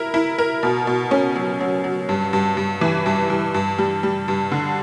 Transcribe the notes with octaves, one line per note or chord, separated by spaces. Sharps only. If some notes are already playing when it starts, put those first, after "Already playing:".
Already playing: E4 A#4
E4
A#4
B2
B2
C#4
F#3
F#3
F#3
G2
G2
G2
E3
G2
G2
G2
G3
G3
G2
D3